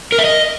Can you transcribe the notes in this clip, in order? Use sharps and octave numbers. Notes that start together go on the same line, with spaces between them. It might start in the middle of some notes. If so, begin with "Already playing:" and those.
A#4
E5
D#5